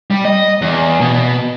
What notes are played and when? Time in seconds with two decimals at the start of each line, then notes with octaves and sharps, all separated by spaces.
0.11 G3
0.25 D#5
0.62 E2
1.01 B2